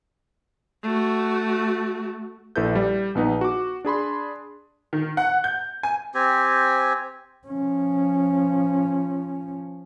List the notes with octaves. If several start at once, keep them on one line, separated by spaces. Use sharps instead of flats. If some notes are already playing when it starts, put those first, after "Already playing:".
A3 F#4
A#1 E4 A4 B4 G6
G3
A#1 B3 D#4 B4
F#4 D6
D4 G#4 B5 C6
D#3
F#5
G6
G#5
C4 G4 G#5
F3 C#4